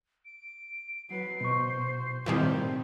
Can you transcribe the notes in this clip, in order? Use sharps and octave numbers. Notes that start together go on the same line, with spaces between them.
D7
F#3 B4 C7
B2 C5 C#6
A2 D#3 G3 C4